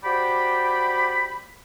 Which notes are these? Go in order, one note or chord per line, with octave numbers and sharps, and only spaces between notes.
F#4 G4 C5 D5 G5 B5